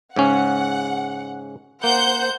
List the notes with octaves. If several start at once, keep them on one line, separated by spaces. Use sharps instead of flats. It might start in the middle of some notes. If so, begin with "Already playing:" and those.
G#2 C#3 C#4 F#5
A#3 C5 F#5 G6